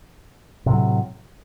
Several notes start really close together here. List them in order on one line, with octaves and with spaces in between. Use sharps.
C3 A2 F#3